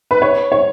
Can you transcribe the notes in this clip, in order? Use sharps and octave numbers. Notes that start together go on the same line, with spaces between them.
B4
C#5
C#5